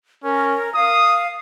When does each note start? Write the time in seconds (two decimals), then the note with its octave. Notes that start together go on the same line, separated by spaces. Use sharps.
0.24 C#4 A#4
0.75 F5 D#6